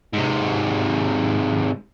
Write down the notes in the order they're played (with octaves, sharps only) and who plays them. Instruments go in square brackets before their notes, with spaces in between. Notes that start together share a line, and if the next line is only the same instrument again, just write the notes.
[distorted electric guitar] G#2 C3